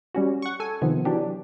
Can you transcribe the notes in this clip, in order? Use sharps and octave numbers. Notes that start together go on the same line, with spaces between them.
G3 C#4 F#4
F#5 C#6
A4 G#5
C3 D#3 F3 B3
E3 F#3 D4 G4